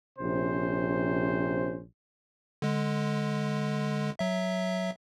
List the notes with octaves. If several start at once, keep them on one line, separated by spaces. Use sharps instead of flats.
A#1 C3 C#4 C5
D3 G#3
F#3 E5